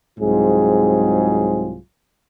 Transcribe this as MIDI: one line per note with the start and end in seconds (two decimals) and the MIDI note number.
0.19 1.77 36
0.19 1.77 44
0.19 1.77 54
0.19 1.77 60
0.19 1.77 65
0.19 1.77 68